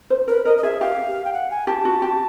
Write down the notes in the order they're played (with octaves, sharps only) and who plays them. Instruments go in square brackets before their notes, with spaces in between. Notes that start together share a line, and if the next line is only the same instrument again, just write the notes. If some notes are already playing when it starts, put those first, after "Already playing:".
[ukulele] C5
[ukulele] A#4 [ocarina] B4
[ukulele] A#4 [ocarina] D#5
[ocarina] D#5
[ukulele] G#4 [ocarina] E5
[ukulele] G4 [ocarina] F5
[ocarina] G5
F#5
G#5
[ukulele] G4 [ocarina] A5
[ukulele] F#4
G4